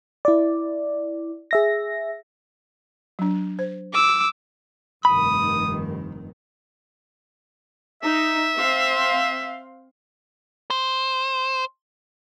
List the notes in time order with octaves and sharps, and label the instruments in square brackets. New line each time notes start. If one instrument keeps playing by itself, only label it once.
[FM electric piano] E4 D5
G#4 E5 A#6
[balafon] F#3 D4
C5
[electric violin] D6 E6
[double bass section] F1 G2 D#3 [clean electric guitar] B5 [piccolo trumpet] D#6
[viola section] D#4 [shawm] E5
[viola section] C4 F5 C6
[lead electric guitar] C5